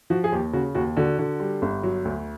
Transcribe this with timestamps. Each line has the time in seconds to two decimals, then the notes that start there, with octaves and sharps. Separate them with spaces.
0.10 F3 F#4
0.24 G#4
0.32 D#2 G4
0.53 C#3 F#4
0.75 D#2 F#4
0.96 D3 F#4
1.19 D3
1.40 G3
1.62 G1
1.83 F#3
2.05 D2